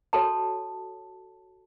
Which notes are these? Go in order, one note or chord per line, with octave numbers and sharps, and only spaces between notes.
F#4 A4 C#5 A5